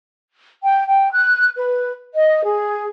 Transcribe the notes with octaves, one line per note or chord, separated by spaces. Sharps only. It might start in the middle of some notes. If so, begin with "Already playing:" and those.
G5
G5
F#6
B4
D#5
G#4